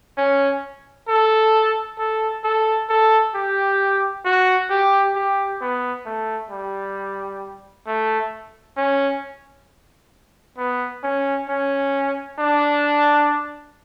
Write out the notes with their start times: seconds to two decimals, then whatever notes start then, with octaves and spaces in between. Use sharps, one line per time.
0.18 C#4
1.09 A4
1.99 A4
2.44 A4
2.90 A4
3.35 G4
4.25 F#4
4.70 G4
5.15 G4
5.61 B3
6.06 A3
6.51 G3
7.87 A3
8.77 C#4
10.58 B3
11.04 C#4
11.49 C#4
12.39 D4